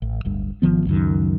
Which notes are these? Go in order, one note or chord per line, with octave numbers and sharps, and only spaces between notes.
A1
D1 G1 G2
G#1 D#3 F3 B3
C#2 F#2 D#3